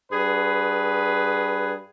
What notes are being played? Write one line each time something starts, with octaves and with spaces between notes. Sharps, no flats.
G2 G#4 B4